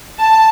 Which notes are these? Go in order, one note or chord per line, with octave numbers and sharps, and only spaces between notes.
A5